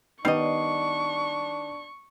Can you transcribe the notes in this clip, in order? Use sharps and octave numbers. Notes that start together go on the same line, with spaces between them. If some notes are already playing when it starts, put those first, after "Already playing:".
D#3 G3 B3 D4 D#5 C#6 C7